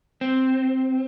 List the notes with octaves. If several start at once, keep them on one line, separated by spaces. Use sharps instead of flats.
C4